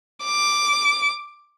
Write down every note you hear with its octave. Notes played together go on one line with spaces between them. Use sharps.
D6